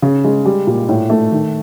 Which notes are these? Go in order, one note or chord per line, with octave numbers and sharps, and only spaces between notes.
C#3
G#3
G3
A#2
A2
A3
D#3